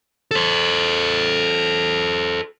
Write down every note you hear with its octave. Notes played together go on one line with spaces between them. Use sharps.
A4 C5